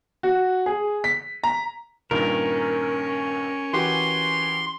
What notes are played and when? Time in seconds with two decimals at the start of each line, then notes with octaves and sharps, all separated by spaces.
0.23 F#4
0.66 G#4
1.04 B6
1.44 A#5
2.11 G2 A#2 D#3 C#4 A#4
3.73 E3 F#4 G4 C6